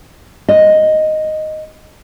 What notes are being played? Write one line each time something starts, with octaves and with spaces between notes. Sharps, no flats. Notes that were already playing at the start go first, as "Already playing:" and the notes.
D#5